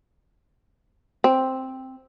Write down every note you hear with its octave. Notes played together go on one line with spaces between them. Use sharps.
C4